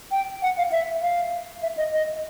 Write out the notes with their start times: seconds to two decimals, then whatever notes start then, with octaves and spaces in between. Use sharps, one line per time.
0.11 G5
0.42 F#5
0.58 F5
0.72 E5
1.02 F5
1.62 E5
1.77 D#5
1.93 D#5